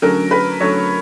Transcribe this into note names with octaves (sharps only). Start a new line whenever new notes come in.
D3 F#3 A3 C#4 A#4
B4
D3 F#3 A3 C#4 C#5